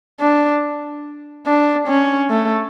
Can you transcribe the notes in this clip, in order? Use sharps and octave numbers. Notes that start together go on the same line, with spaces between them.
D4
D4
C#4
A3